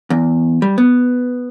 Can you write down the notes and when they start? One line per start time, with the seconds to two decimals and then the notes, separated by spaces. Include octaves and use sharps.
0.10 E2
0.62 G3
0.78 B3